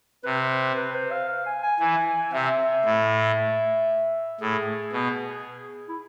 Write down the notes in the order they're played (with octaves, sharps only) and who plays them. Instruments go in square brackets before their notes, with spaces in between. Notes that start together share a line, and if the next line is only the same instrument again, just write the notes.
[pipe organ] C3 [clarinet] B4
[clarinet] B4
C5
F5
F5
G#5
G#5
[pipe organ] E3 [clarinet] G#5
[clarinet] G#5
[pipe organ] C3 [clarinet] E5
[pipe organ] A2
[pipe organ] A2 [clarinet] G#4
[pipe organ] B2
[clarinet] E4